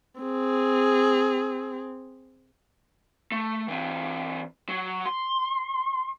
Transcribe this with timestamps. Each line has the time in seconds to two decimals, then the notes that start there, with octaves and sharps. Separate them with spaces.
0.20 C4 G#4
3.32 A3
3.68 E3 C4
4.69 F#3
5.05 C6